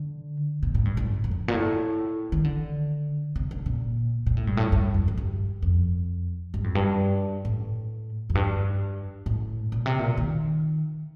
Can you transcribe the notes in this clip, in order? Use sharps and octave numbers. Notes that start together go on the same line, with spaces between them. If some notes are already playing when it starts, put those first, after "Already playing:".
Already playing: D3
A#2
A2
G2
A2
F2
G2
A#2
A2
D#3
D3
C3
D3
A#2
A#2
A2
G2
A2
G2
F2
F2
G2
F2
G2
F2
G2
A2
F2
G2
A2
A#2
C3
A#2
D#3